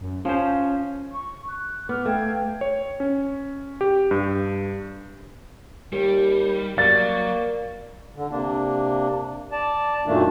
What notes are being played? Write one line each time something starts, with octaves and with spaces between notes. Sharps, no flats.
F#2
F3 C#4 C5
C#6
F#6
B3 D6 F6
A3 F5 G5 G#6
C#5
C#4
G4
G2
D#2 G3 G4
F#3 A#3 D5 A6
D3
C3 A#3 D4
D5 A5
F#2 A#2 D#3 A3 A#3 D4